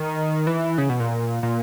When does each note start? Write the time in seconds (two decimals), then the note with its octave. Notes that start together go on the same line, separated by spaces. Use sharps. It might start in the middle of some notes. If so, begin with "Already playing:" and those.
Already playing: D#3
0.47 E3
0.78 C#3
0.89 B2
1.00 A#2
1.43 A#2